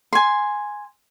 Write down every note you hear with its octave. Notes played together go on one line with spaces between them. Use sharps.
G#5 C6